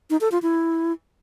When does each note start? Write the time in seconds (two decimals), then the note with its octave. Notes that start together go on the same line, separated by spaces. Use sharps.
0.10 D#4
0.21 A4
0.32 F4
0.43 E4